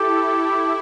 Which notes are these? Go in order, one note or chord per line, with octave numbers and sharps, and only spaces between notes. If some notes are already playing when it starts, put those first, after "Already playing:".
Already playing: E4 G4 A4
E4